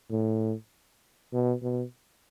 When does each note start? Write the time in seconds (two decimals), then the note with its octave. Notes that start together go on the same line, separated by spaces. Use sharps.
0.11 A2
1.33 B2
1.63 B2